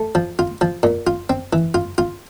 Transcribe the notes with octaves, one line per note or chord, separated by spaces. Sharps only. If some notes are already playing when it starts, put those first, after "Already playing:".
Already playing: A3
F3
F4
F3
A#2
F4
C4
E3
F4
F4